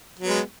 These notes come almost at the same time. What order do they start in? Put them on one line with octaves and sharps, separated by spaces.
F#3 B3 G#3